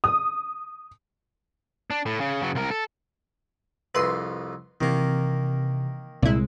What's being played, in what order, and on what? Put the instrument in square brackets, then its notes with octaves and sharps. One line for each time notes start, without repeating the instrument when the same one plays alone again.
[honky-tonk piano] D#6
[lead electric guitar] D4
A2
C#3
C#3 F#3
C2 A#4
A4
[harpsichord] C2 F2 [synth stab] B4 C6
[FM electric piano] C3 E3 [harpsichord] D#3 A#3
[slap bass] C2 G#3 [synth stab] A#2 E4